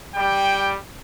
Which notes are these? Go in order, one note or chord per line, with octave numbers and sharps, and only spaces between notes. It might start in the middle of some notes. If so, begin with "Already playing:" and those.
G3 G5